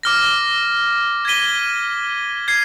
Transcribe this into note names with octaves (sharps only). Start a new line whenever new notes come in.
D6 F6 A#6
G#6 B6 D#7 G7
G#6 C7